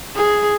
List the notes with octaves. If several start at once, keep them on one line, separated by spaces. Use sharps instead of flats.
G#4